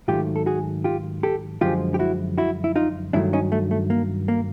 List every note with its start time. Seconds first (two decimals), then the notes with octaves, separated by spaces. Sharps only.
0.08 G#2 D#3 F#3 A3 F4 G4
0.36 A4
0.46 F#4 G#4
0.84 F4 G4
1.23 G4 A4
1.61 F#2 D3 F3 G#3 F4 G4
1.94 G4
1.99 E4 F#4
2.38 E4 F#4
2.64 E4
2.76 D#4 F4
3.13 G2 D#3 F#3 A3 D4 E4
3.33 C#4 D#4
3.52 A3
3.71 A3
3.90 A#3
4.28 A#3